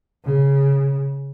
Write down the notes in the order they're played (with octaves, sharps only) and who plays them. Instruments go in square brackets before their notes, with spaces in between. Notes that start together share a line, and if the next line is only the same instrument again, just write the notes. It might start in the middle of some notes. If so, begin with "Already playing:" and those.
[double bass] C#3